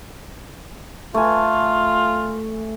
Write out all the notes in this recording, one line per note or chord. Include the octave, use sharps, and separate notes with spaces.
A3 F4 G#5